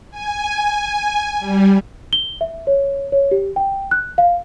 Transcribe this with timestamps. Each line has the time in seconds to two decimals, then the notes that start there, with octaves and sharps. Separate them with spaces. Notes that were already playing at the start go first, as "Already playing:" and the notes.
0.11 G#5
1.40 G3
2.13 G7
2.41 E5
2.67 C#5
3.12 C#5
3.31 G4
3.56 G5
3.91 F#6
4.18 F5